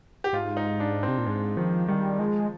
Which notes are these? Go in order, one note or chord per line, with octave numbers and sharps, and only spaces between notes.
G4
G#2 F4
D#4
D4
C4
C3
A#2
G#2 G#3
D#3 F3
D#3 G3
F3 G#3